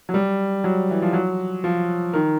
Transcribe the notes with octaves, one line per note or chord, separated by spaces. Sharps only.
F#3
G3
F#3
E3
F3
F#3
F3
D#3